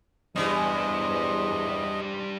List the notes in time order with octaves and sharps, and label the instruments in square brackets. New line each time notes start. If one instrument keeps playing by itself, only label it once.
[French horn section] E2 [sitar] C3 E3 [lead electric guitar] G3 D4 [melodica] D#5